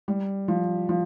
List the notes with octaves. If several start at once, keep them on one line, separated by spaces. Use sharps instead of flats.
G3
F3
F3